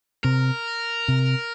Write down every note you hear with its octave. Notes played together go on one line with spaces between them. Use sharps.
C3 A#4
C3